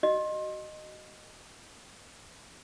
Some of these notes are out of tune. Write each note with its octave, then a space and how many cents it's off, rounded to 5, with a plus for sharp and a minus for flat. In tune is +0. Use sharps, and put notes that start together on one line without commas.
F#4 +25 D#5 -15